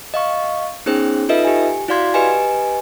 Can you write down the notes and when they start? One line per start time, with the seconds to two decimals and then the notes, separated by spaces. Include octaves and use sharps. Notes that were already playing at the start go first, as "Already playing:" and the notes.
0.14 D#5 F5 C#6
0.86 B3 C#4 D#4 G#4 C5 G5
1.29 D#4 F4 A4 B4 D#5 E5
1.45 G4 G#5
1.88 E4 F#4 D5 F5 C6 G#6
2.14 G4 B4 D#5 G#5